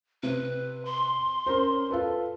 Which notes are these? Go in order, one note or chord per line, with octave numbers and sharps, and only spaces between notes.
C3 B4
C6
C#4 A#4 C5
F4 A4 B4